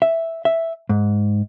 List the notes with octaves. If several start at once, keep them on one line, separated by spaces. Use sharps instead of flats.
E5
E5
G#2